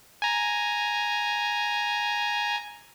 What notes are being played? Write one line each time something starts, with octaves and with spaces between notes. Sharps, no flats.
G#5 A#5